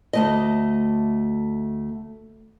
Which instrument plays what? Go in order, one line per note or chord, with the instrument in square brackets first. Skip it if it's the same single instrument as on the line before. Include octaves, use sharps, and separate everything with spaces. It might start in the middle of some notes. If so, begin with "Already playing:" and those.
[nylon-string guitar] D2 A3 D#5